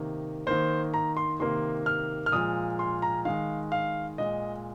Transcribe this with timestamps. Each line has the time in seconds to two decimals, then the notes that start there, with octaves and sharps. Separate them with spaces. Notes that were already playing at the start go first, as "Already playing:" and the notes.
Already playing: C3 D#3 A#3
0.47 D#3 A#3 C5
0.94 A#5
1.17 C6
1.40 C3 D#3 A#3 C6
1.86 F6
2.26 F6
2.32 A#2 F3 G#3 D#6
2.79 C6
3.02 A#5
3.25 D#3 G#3 F5
3.72 F5
4.18 A#2 G#3 D#5